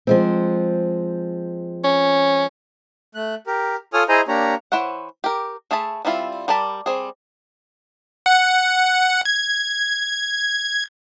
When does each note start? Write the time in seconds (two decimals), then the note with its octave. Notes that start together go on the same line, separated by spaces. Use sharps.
0.07 F3 G#3 C4
1.84 C#4
3.15 A3 F#6
3.47 G4 A#4
3.93 F4 A4 C#5 G#5 D#6 F6
4.09 E4 G#4 C5 D#5 G#5 A#5
4.28 A#3 D4 G4 C#5 A#5
4.72 E3 E4 C5 C#5 F#5
5.24 G4 A#4
5.71 A3 G#4 E5 A5 B5
6.05 G3 C4 E4 F4
6.48 G3 A#4 D5 A5 B5
6.86 G3 C4 G#4
8.26 F#5
9.25 G#6